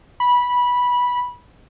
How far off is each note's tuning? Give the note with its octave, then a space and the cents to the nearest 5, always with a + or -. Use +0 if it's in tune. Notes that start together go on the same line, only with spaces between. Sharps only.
B5 -15